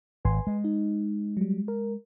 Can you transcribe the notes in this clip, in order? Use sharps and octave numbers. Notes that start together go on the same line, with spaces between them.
G#1 B4 G#5 C6
G#3
D#4
F#3 G3
A#4